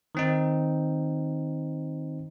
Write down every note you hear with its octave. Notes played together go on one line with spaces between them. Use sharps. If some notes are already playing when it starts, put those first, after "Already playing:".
D#3 C4 D#4